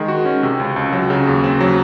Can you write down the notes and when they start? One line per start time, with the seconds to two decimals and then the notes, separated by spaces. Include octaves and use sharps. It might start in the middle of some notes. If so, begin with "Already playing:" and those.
Already playing: D#3 G#3
0.08 F#4
0.25 C#4
0.43 C3
0.60 C#2
0.76 C#2
0.93 F#3
1.10 C#3
1.27 D#2
1.44 C4
1.61 F#3